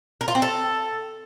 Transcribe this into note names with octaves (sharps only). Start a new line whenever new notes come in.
A#4
F4
C4
A4